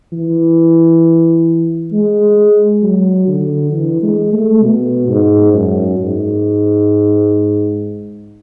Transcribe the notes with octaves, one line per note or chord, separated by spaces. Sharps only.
E3
G#3
F#3
D3
E3
G#3
A3
B2
G#2
F#2
G#2